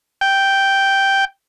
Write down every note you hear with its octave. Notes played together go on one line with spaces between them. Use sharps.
G5